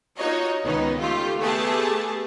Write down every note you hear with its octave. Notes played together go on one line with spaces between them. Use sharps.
D#4 F4 F#4 C#5 D#5
C#2 D#3 B3 C#4 D#4
A3 F4 G4
A3 B3 G4 G#4 A5